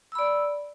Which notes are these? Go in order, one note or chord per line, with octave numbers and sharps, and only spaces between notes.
D5 B5 E6